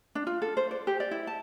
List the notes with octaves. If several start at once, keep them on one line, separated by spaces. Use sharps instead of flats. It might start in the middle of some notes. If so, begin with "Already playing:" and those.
D4
F4
A4
C5
D5
G4
D5
E4
A5